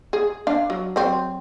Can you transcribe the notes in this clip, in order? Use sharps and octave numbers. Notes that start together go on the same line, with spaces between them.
G#4
D4 F5
F#3
F#3 C4